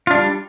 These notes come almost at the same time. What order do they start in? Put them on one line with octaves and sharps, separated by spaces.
F4 D4 G3